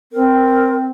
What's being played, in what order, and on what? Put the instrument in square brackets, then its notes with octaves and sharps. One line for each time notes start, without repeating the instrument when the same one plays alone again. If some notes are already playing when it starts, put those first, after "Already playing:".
[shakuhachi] C4 [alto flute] A#4